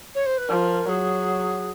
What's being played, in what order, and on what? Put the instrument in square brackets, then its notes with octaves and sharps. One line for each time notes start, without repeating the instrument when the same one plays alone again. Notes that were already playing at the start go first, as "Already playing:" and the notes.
[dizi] C#5
C5
B4
[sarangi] F3 [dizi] A#4
[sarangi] F#3 [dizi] G#4